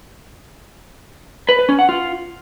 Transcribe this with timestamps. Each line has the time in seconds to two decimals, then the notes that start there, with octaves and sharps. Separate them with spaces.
1.49 B4
1.59 B4
1.69 C#4
1.79 F#5
1.89 F4